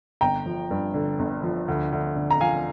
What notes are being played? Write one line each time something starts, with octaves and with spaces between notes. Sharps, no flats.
G1 G5 A#5
F3
G2
D3
G1
F3
D2
D2
D3
A#5
F3 F5 G#5